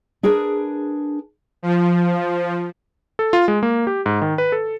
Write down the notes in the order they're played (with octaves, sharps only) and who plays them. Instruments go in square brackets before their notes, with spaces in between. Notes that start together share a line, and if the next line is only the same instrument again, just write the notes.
[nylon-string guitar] D4 G#4 A#4 B4
[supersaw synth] F3
[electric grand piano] A4
F4
G#3
A#3
G4
G#2
D#3
B4
A4